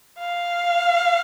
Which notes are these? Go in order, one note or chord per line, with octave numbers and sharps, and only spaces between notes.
F5